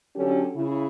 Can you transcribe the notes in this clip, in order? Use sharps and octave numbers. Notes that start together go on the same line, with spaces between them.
D3 F#3 C#4 G4 A4
C#3 E4